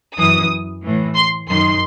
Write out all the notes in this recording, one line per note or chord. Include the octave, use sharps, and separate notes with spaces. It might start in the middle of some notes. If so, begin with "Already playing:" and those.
F#2 E3 D#6
A2 E3
C6
F#2 D#3 C6